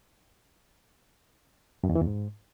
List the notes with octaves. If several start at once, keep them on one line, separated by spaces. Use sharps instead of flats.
F#2
E2
E3
E2
G#2